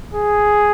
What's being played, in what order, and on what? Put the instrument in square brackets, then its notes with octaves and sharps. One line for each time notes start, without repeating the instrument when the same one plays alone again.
[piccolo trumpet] G#4